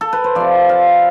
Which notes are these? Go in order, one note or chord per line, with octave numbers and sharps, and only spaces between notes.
A4
B4
C5
C3 F3 D5
F5